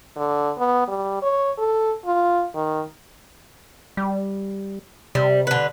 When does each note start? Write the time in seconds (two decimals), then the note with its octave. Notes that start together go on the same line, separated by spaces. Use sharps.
0.17 D3
0.58 B3
0.88 G3
1.22 C#5
1.58 A4
2.05 F4
2.55 D#3
3.97 G3
5.15 C3 G3
5.47 D3 B4